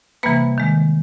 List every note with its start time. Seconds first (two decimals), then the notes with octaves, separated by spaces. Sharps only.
0.23 C3 E3 G3 A#3 B4 B5
0.58 D#3 G#3